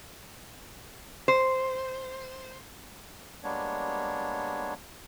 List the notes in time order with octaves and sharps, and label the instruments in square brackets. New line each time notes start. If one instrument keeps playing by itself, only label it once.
[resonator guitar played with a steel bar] C5
[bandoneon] G3 G#3 A#3 B3 D4 C#5